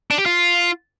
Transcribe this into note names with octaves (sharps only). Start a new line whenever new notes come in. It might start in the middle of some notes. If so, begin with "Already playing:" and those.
D4
G4
F4